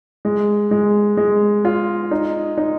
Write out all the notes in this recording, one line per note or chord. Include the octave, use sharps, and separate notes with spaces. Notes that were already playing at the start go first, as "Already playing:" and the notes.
G#3
G#3
G#3
F4
D#4
D#4